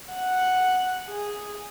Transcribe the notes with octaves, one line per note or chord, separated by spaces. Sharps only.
F#5
G#4